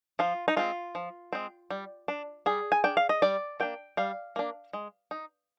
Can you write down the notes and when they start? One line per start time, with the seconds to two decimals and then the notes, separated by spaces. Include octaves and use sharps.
0.19 F3 F4
0.48 D#4
0.56 G#3 C4 F4
0.95 F3
1.33 G#3 C4
1.70 G3
2.08 D4
2.46 G3 G#4
2.72 G#5
2.84 D4 G5
2.97 F5
3.09 D#5
3.22 G3 D5
3.60 A#3 D4 G5
3.97 G3 F5
4.36 A#3 D4
4.73 G#3
5.11 D#4